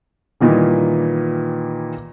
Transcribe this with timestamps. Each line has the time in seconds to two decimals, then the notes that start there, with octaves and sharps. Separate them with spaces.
0.41 A#2 D#3 E3 G3